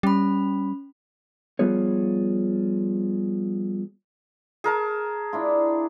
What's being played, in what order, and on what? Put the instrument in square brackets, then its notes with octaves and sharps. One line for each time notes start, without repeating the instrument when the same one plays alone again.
[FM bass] G3 [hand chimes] C#4 B5
[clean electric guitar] F3 G3 B3 F4 G#4 C#5
[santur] G#4 A#4 A5
[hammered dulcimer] D4 E4 F4